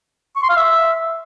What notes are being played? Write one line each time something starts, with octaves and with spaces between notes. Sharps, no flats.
C#6
C6
F5
E5